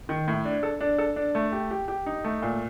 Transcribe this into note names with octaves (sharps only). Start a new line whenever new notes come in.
D#3
A2
D4
A4
D4
A4
D4
A3
G4
G4
G4
D#4
A3
A#2